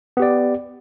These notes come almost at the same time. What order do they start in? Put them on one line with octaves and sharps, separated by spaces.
B3 G4 D5